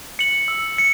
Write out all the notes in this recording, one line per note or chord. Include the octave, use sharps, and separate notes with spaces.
C#7 F#7
E6
C#7